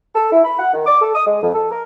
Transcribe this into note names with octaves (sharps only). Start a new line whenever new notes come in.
A4
E4
B5
F#5
D#3
D6
A4
D#6
G#3
F2
A4
A#4